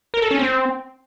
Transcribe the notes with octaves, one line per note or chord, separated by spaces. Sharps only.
A#4
A4
C#4
C4